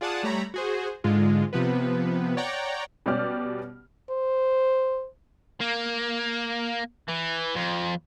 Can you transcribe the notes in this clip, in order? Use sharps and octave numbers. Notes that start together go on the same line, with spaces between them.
F4 G#4 D5 F#5 A5 D#6
G3 A3 C#5 A#5 B5
F#4 G#4 C5
G#2 D3 G#3 F4
C3 F3 B3 B4
C#5 D5 F#5 G5 A#5
B2 G3 C#4 G4 D5 F6
C5
A#3
E3
F2